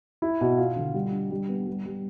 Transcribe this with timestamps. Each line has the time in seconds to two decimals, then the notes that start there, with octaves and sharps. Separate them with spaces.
0.22 E4
0.41 B2
0.58 F4
0.76 D3
0.94 G3
1.12 D4
1.31 G3
1.49 B3
1.67 G3
1.86 G3